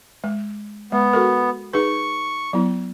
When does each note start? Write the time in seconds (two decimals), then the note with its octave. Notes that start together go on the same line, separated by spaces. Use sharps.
0.24 G#3
0.92 G#3 B3
1.13 F#4 A4 A#4
1.73 D#4 G#4 B4 C#6
2.53 F#3 B3 E4